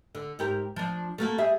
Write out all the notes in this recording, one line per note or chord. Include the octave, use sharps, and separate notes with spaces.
D3
G#2 G4 A#4
F3 D4
A3 A#3 F#4
G3 G#4 E5